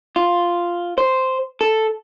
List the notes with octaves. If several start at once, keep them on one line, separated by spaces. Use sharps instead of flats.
F4
C5
A4